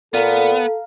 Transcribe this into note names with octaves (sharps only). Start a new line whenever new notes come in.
A#2 B3 A4 F5 A#5